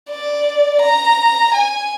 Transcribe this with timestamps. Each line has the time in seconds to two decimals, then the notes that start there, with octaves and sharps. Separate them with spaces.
0.10 D5
0.82 A#5
1.54 G#5